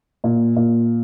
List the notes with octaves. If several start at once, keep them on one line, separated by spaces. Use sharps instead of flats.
A#2
A#2